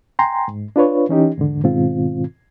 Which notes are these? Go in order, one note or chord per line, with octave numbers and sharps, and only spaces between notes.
G5 G#5 A#5 C6
G#2
D4 F4 B4 C#5
E3 C#4 D#4 G4
E2 G#2 D3
G#2 B2 D#3 C4 F4